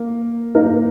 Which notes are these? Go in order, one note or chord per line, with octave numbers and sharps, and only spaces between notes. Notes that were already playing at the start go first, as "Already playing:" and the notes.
Already playing: A#3
A#3 D#4 A#4